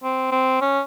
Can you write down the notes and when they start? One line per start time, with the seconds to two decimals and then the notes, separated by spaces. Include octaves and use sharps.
0.03 C4
0.31 C4
0.61 C#4